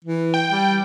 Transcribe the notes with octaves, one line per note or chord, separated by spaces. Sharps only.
E3
G5
G3